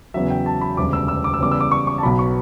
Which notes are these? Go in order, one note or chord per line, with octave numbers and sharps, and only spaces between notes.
E2 C#3 F#3 E5
G5
A5
B5
E1 D2 C#3 G3 D6
E6
E6
D6
E6
E2 C#3 G3 D6
E6
D6
C#6
C#6
A5
B1 B2 F#3 B5
C#6